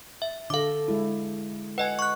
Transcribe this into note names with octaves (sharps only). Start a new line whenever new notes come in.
E5
D3 A4 F5 D6
G#3 E4
B4 D#5 F#5 G#5
C#6 F#6